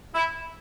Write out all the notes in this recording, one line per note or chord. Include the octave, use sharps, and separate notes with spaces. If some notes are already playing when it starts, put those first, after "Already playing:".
E4